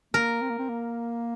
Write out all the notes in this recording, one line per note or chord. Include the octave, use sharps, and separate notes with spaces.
A#3 A#4
C4
A#3
C4
A#3